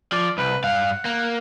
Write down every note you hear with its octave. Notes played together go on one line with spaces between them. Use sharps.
F3 D5
C2 B4
G2 F5 F#5
A#3